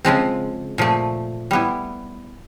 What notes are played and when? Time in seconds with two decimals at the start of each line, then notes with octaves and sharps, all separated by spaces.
0.05 C#3 F3 G#3 C4
0.78 A#2 F3 A3
1.51 G3 B3 E4